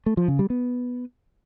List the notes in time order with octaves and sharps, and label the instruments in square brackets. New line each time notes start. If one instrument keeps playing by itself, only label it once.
[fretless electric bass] A3
F3
C#3
G3
B3